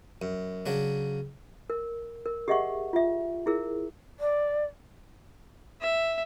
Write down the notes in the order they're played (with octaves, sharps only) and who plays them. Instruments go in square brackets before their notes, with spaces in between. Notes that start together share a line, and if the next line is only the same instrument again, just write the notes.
[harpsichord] F#2
C#3 F#3 D4
[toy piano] A#4
A#4
G4 G#4 D#5 E5 F#5 C#6
F4 E5
E4 G#4 A#4
[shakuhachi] D5
[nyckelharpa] E5